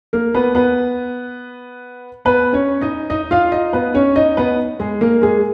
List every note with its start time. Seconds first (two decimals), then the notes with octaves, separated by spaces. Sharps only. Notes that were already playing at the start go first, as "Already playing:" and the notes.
0.13 A#3 A#4
0.35 B3 B4
0.55 B3 B4
2.25 B3 B4
2.53 C#4 C#5
2.81 D#4 D#5
3.10 D#4 D#5
3.31 F4 F5
3.52 D#4 D#5
3.73 B3 B4
3.94 C#4 C#5
4.16 D#4 D#5
4.37 B3 B4
4.80 G#3 G#4
5.01 A#3 A#4
5.22 G#3 G#4